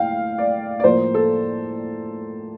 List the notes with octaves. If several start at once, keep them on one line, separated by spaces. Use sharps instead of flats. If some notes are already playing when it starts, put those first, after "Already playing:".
Already playing: A2 A#3 F5 G5
D5
D5
A2 F3 A#3 C5
A4